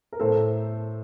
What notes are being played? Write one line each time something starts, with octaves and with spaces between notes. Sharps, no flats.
A#4
A2 A4 C5